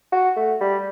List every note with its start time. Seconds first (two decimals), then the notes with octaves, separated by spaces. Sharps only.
0.12 F#4
0.36 A3
0.60 G3